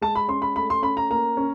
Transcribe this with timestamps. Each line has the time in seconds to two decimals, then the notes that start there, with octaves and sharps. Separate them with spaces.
0.01 G#3 A5
0.15 B5
0.28 C#4 C6
0.42 B5
0.56 A3 B5
0.70 C6
0.82 C#4 B5
0.97 A#5
1.10 A#3 A#5
1.37 C#4